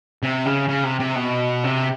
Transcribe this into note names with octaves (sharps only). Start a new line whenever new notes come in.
C3
C#3
C#3
C3
C3
B2
C3